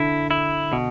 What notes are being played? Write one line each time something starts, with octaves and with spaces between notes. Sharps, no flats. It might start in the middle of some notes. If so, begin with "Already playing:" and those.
Already playing: D3 E4
E4
B2